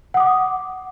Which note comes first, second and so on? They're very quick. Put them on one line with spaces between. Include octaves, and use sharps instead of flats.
F#5 D#6 D6